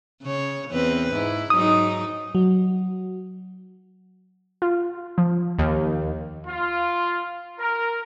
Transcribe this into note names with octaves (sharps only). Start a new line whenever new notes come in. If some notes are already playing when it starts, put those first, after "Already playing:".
C#3 C#5
E2 C4 B4
G#2 E4
G#2 F#3 D#4 D#6
F#3
F4
F3
D#2
F4
A#4